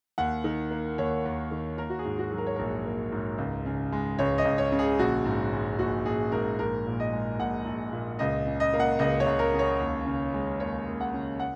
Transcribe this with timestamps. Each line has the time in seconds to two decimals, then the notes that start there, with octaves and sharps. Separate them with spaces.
0.18 D#2 F#5
0.44 D#3
0.71 A#3
0.98 D#2 C#5
1.25 D#2
1.51 D#3
1.78 A#3 A#4
1.90 F#4
1.99 G#4
2.05 G#2
2.19 F#4
2.31 F#3
2.38 A#4
2.46 C#5
2.56 A#1 A#4
2.85 A#3
3.12 G#2
3.38 C#2
3.66 C#3
3.92 G#3
4.19 C#2 C#5
4.38 D#5
4.45 C#2
4.58 C#5
4.72 C#3
4.79 G#4
4.99 A#1 F#4
5.25 G#2
5.52 G#3
5.79 A#1 F#4
6.06 A#1 G#4
6.32 G#2 A#4
6.59 A#1 A#4
6.86 A#2
7.00 D#5
7.13 G#3
7.39 A#1 F#5
7.66 A#1
7.92 A#2
8.19 C#2 D#5
8.47 C#3
8.60 D#5
8.73 A#3
8.80 F#5
8.99 C#2 D#5
9.20 C#5
9.26 C#2
9.39 A#4
9.54 C#3
9.59 C#5
9.80 D#2
10.06 C#3
10.34 G#3
10.60 D#2 C#5
10.87 D#2
11.01 F#5
11.14 C#3
11.40 F#5